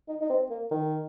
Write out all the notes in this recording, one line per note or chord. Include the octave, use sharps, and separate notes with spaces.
D#4
D#4
C4
A#3
D#3